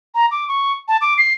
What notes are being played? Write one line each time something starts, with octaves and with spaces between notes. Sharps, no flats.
A#5
D6
C#6
A5
D6
C7